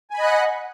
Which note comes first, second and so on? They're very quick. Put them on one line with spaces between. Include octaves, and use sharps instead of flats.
G#5 B5 D#5 F#6 F#5